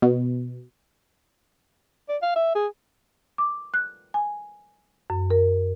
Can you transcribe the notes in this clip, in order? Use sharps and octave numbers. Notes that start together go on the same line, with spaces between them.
B2
D5
F5
E5
G#4
D6
F#6
G#5
F#2
A#4